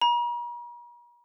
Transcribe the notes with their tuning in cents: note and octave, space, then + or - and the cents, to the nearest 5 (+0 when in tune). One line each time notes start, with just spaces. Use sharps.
A#5 +45